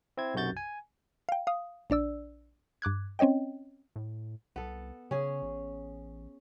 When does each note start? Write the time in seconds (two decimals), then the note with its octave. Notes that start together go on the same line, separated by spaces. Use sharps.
0.17 C4 E4 G#6
0.34 B1 F#2 C3 F#4 G6 A6
0.57 G#5
1.29 F5 G5
1.47 F5 D#6
1.90 A#1 D4 D5 E6
2.82 G2 D6 F#6 G#6
3.19 C4 C#4 C#5 D#5 G5
3.96 A2
4.56 C2 B3 A4
5.11 C#3 C#4 G#4
5.42 A1